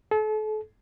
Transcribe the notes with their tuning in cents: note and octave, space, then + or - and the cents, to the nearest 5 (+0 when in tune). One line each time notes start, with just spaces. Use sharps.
A4 -35